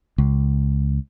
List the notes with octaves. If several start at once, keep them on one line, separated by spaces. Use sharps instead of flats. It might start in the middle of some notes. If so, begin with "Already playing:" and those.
C#2